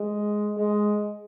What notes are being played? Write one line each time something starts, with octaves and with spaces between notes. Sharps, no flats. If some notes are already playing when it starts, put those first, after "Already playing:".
Already playing: G#3
G#3